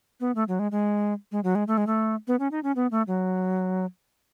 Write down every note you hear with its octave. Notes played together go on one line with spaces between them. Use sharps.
B3
A3
F#3
G#3
G#3
G#3
F#3
G#3
A3
G#3
A3
B3
C#4
D#4
C#4
B3
A3
F#3